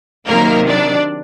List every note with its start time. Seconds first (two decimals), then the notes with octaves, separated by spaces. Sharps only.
0.26 C3 D#3 F#3 A#3 A#4
0.67 D4 D5